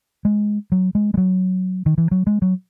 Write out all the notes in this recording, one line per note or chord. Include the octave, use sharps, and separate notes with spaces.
G#3
F#3
G#3
G#3
F#3
D#3
E3
F#3
G#3
F#3